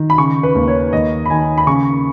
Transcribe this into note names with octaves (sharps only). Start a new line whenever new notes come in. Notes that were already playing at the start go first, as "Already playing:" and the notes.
Already playing: D#3
B5
C#3 C#6
B4
D#2
C#5
D#2 D#5
B5
D#3 G#5
B5
C#3 C#6